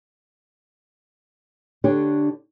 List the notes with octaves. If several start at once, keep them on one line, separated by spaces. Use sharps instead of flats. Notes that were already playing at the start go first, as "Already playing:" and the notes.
D3 D4 G4 C#5